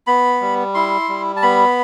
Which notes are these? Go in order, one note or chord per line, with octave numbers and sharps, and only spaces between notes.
B3 B5
G3
E4 C6
G3
A5
B3 B5